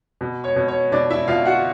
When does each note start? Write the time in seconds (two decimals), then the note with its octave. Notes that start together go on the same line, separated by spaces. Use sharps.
0.21 B2
0.44 C#5
0.56 B2
0.68 C#5
0.92 B2 D4 D5
1.10 E4 E5
1.28 B2 F4 F5
1.45 F#4 F#5